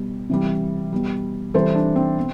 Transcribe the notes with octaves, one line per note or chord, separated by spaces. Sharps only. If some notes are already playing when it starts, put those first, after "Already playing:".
Already playing: B2 G3
C3 E3 G3
B2 G3
C3 E3 G3 A4 C5
D4
C4
B2